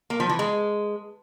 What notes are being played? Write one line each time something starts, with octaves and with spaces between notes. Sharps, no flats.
A#3
F3
E3
G#3